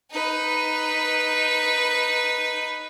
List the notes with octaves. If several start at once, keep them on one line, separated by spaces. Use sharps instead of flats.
D#4 B4